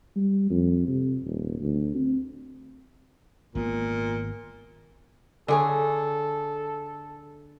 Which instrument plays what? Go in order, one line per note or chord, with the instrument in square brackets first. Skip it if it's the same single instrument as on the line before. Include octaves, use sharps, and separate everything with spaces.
[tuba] G3
F2
C3
D#1
D2
C4
[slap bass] G#1 A#3 B3 [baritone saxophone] A#2
[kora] D3 G#4 C#5 [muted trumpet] A4